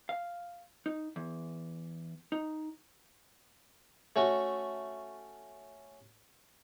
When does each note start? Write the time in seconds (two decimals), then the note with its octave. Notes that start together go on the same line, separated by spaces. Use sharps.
0.09 F5
0.86 D#4
1.16 E2
2.32 D#4
4.16 A3 C#4 F#4